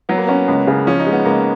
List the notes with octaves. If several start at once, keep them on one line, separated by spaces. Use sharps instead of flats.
F#3 B3
A#3
B3 C#4
C#2
C#3
F3 C#4
D#4
G#3
B3
C#2 A#3